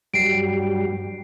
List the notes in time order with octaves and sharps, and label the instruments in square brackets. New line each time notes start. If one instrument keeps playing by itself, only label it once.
[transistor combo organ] G2 F#3 G3 [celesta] C7 D7